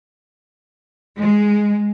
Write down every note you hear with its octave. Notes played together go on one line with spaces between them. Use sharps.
G#3